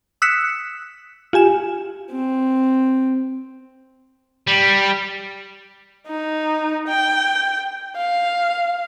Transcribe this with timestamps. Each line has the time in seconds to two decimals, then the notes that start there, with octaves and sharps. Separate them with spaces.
0.22 D#6 E6 F#6 B6 C#7 E7
1.33 F4 G4 G#5 E7
2.11 C4
4.47 G3
6.07 D#4
6.88 G5
7.96 F5